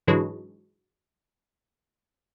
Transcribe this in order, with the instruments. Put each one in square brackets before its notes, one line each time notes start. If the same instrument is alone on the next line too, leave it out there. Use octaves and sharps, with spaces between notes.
[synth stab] G#2 D3 E3 F#3 G#3